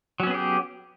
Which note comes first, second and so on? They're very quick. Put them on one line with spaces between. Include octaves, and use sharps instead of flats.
F#3 C#4 B3 G#4 G4